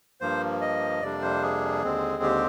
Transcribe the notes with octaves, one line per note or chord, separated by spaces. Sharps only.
G2 F3 A#3 C5
D#5
F2 C3 G3 A#3 D4 D5
C5
G#4
D#2 D3 G#3 C4
G4